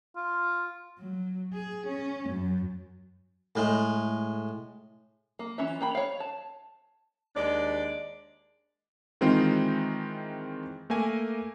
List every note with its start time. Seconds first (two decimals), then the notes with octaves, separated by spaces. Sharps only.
0.16 F4
0.99 F#3
1.54 G#4
1.87 C#4
2.29 F#2
3.56 A2 G#3
5.39 A#3
5.58 E3 C#4 F4 E5
5.81 A#3 G5 B5
5.95 C#5 F5
6.20 A5
7.35 D#2 G#3 D4 D5
9.21 D#3 E3 G#3 C4 D#4 F4
10.90 A3 A#3 A#4 G#5